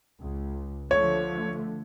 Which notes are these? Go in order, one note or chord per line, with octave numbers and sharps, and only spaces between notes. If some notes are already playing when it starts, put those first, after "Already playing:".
C#2
D3 F3 A3 C#5